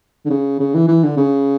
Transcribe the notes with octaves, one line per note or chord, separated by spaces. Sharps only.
D3
C#3
C#3
E3
E3
D3
C#3